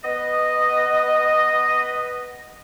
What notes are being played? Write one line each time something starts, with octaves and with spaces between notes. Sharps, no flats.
B3 B4 D#5